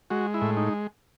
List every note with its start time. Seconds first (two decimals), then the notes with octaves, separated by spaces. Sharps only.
0.10 G#3 F#4
0.34 E4
0.42 A2
0.57 D#4